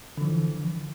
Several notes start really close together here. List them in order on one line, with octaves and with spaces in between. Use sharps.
D3 F3 E3